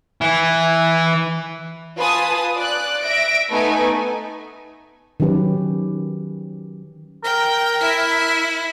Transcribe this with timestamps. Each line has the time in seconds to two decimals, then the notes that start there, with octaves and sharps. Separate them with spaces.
0.21 E3 E4
1.98 F4 B4 G#5 A5 D#6
2.57 D5 F#6
3.02 E5 A#6 D7
3.50 A3 B3 D#4 B4 G#5
5.20 D#3 F#3 C#4 G4 B4
7.24 A#4 G5
7.80 E4 E5